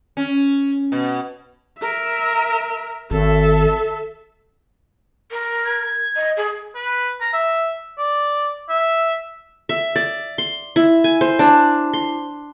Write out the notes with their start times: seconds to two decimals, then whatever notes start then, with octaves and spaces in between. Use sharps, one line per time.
0.17 C#4
0.92 B2
1.78 A#4 E5
3.11 G#1 A4 E5
5.31 A#4
5.65 G#6
6.16 D#5
6.37 G#4
6.75 B4
7.21 A#5
7.33 E5
7.98 D5
8.69 E5
9.69 E5
9.96 D5
10.38 C6
10.76 E4
11.04 G#5
11.21 C5
11.39 D4
11.93 C6